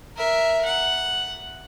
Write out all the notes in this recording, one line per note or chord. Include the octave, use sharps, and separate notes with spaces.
A#4 E5
F#5